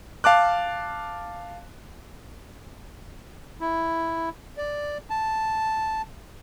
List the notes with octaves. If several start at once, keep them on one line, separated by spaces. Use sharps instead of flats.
F5 A5 D6 F#6
E4
D5
A5